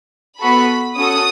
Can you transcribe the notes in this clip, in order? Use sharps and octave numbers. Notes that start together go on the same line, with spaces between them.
B3 F#4 A4 B5
C#4 F#4 A4 D#6